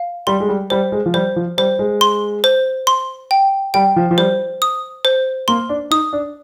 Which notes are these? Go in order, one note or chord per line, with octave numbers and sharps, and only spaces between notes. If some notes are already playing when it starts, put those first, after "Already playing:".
Already playing: F5
G3 C6
G#3
G3
G3 C5
G#3
F3
G3 C5
F3
G3 C5
G#3
C6
C5
C6
G5
G3 G5
F3
F3
G3 C5
D#6
C5
A#3 C6
D4
D#4 D#6
D4